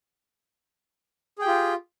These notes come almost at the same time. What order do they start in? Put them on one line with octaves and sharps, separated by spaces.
G#4 G5 G4 F4